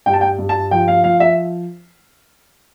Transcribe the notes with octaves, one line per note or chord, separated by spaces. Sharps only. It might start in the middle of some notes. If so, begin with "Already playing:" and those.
G2 G5
A5
G5
G2
A5
F3 G5
F5
F3 F5
E5